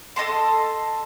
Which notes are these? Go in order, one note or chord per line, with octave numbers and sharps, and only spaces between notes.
A4 D#5 A5 C6